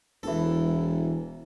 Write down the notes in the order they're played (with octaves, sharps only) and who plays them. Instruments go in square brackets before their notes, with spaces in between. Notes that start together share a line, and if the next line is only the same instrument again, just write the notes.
[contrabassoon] E1 [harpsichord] E3 A4